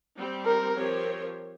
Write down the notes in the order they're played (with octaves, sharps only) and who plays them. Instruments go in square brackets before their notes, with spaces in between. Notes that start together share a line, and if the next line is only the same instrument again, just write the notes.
[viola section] G3 C4 G4
[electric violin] A#4
[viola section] F3 C4 G4 A#4 C#5